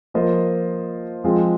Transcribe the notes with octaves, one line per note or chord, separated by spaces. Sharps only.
F3 A#3 F4 C5 D#5
F3 G#3 C4 F4 G#4